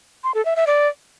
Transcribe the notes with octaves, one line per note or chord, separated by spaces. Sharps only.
C6
A4
E5
E5
D5